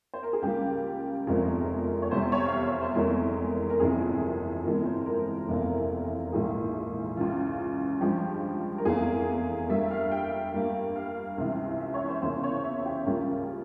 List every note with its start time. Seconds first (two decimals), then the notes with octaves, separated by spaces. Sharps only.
0.14 C5
0.23 A#4
0.33 G#4
0.42 C#2 C#3 G3 A#3 G4
1.27 F1 E2 C3 F3 G#3 A#4
2.02 C#5
2.11 E2 C3 G3 C5
2.32 C#5
2.46 F5
2.53 E5
2.67 C#5
2.81 C5
2.95 F1 E2 E3 G#3 A#4
3.70 A#4
3.80 G1 F2 C3 E3 G#4
4.64 G1 F2 E3 G#3 A#4
4.85 C5
5.06 A#4
5.48 F1 E2 C3 E3 A#3
6.32 A#1 G#2 E3 A#3 G#4
7.16 C#2 C#3 E3 F4
8.01 G2 F3 G#3 G4
8.78 A#4
8.85 F1 E2 E3 A#3 G#4
9.69 G2 G3 A#3 E5
9.91 F5
10.11 G5
10.54 G2 G3 A#3
10.96 F5
11.38 C#2 C3 E3
11.80 E5
11.94 C#5
12.08 C5
12.22 E2 C#3 E3 A#3 C5
12.43 C#5
12.64 E5
12.85 G4
13.06 C#2 C#3 G3 A#3 F4